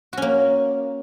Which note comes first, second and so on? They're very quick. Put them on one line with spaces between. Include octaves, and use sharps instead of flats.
F#4 C#4 A#3